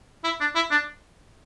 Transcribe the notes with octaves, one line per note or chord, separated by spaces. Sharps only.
E4
D4
E4
D4